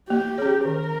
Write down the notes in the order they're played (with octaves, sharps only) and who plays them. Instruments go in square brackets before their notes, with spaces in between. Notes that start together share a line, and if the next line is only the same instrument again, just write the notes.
[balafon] A#3 [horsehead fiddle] G4
[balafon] C#4 G#4 C#5
[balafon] D#3 [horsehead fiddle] A#4